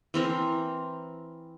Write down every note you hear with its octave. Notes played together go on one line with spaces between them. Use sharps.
E3 C4 A#4